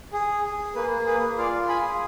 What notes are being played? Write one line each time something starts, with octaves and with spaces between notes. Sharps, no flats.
G#4
G#4
A#3 B4
G#4 B4
F4 D5 F5
G#4 G#5 B5